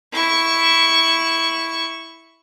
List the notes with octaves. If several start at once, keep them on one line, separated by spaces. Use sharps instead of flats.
E4 C#6